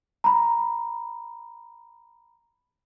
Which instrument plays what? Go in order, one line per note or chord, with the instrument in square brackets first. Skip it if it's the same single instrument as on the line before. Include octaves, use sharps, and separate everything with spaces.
[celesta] A#5 B5